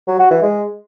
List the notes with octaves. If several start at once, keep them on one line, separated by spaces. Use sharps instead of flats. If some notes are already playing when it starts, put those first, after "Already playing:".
F#3
F#4
E3
G#3